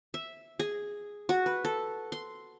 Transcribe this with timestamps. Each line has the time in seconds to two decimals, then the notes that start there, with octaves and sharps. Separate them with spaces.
0.14 E5
0.59 G#4
1.29 F#4
1.46 B4
1.65 A4
2.12 C6